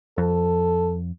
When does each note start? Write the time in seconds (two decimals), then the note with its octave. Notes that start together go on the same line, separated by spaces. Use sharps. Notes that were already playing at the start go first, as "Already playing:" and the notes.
0.18 F2 A4